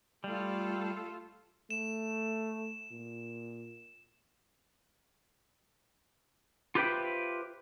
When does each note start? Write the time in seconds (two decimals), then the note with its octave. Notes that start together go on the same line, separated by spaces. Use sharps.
0.24 G3 A3 F4 A4
1.70 A3 E7
2.91 A#2
6.75 F4 G4 B4 C5 E5 G5